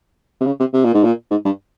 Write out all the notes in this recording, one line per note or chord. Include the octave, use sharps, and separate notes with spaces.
C3
C#3
C3
C3
A#2
G#2
A#2
G#2
G2